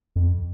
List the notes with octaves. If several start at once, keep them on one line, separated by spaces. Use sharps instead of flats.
F2